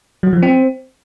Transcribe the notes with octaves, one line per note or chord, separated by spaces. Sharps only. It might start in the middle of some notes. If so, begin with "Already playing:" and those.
F#3
F3
C4